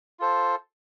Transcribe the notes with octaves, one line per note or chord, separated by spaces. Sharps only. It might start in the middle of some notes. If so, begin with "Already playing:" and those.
F4 A4 C5